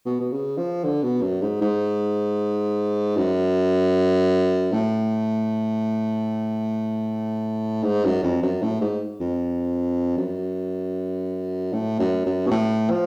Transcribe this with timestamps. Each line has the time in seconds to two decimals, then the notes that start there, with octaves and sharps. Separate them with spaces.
0.06 B2
0.20 B2
0.32 C#3
0.58 F3
0.84 D3
1.03 B2
1.22 F#2
1.42 G#2
1.61 G#2
3.17 F#2
4.72 A2
7.84 G#2
8.04 F#2
8.24 F2
8.43 F#2
8.62 A2
8.81 G#2
9.20 F2
10.17 F#2
11.73 A2
11.99 F#2
12.26 F#2
12.47 B2
12.51 A2
12.90 F3